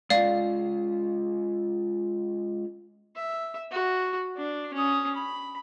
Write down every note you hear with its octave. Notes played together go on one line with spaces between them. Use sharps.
G#3 C#4 F4 D5 F5
E5
F#4
D4
C#4 D#6
B5